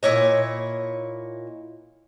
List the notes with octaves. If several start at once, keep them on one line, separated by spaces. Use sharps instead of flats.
A#2 E4 C#5 D#5